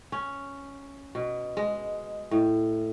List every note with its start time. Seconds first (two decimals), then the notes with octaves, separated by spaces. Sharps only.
0.12 C#4
1.15 B2
1.57 G#3
2.31 A2